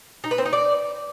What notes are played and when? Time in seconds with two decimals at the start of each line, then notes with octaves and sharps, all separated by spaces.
0.24 D#4
0.31 B4
0.38 C4
0.45 D#4
0.53 D5